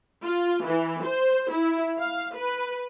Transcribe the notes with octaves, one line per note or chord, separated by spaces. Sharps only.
F4
E3
C5
E4
F5
B4